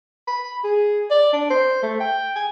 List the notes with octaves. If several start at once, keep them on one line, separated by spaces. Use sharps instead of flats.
B5
G#4
D5
D4
C5
A3
G5
G#5